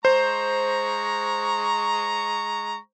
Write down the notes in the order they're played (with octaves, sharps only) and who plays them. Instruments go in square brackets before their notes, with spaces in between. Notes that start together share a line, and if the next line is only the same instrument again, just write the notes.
[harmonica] G#3 A#5 C#6 [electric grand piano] C5